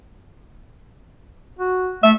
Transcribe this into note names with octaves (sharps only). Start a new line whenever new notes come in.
F#4
A3 E5